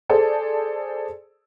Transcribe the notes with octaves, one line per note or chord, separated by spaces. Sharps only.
G#4 A4 C5 D5 A5